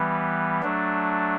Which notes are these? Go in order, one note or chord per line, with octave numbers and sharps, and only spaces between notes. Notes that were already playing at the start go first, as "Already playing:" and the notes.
Already playing: E3 G3 B3
F#3 A3 D4